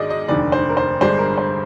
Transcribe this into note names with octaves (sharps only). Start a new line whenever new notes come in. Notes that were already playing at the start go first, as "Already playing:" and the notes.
Already playing: G#2 D#3 G#3 D4 D5 D#5
D#5
F1 D#2 D3 D5
C5
A#4
C5
G1 G2 D3 G#3 D4 C5
A#4
C5